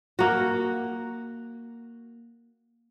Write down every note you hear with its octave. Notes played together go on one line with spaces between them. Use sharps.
A#3 F#4